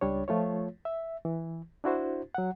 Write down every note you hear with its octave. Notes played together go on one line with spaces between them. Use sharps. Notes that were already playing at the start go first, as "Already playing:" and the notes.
C#2 G3 D4 C#5
F3 A3 F4 C#5
E5
E3
D4 E4 F#4 C5
F#3 F#5